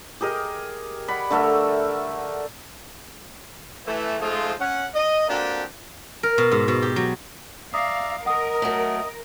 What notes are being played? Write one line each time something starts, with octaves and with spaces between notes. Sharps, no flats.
G4 G#4 A#4 D#5
D5 F#5 B5
D3 A3 A#4 E5
E3 A3
F3 G#3 A3 D#4 F4 C5
C#4 F#5
D#5
A#3 C4 D4 F#4 G4 A4
A#4
B2
G#2
B2
G4
F#3
D5 E5 F5 A#5 D#6 C7
A#4 D#5 F#5 D#6
F#3 A3